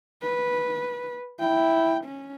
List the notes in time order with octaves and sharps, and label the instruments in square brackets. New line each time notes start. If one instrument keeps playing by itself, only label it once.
[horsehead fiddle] B4
[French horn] E4 [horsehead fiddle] G5
[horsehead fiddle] C#4